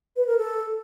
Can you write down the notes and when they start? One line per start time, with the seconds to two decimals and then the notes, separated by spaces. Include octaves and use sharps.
0.16 B4
0.27 A#4
0.37 A4